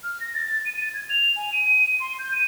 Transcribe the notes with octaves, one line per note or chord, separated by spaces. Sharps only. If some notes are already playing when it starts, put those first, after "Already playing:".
F6
A#6
A6
D#7
A6
G#6
F7
G#5
D#7
C6
G6
D#7